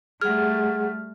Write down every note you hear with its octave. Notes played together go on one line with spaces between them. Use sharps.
G3 A3 G#4 F#5 F6